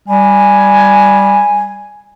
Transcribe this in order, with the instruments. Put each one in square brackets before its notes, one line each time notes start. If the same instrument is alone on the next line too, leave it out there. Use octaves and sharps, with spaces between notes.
[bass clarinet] G3 [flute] G#5